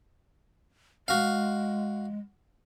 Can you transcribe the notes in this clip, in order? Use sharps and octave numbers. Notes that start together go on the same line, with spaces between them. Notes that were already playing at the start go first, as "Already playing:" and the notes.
G#3 F#4 F5